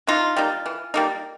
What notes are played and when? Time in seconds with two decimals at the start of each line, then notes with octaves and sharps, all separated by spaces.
0.07 E3 D#4 F4
0.37 G3 A#3 D#4
0.66 E3
0.94 G3 A#3 D#4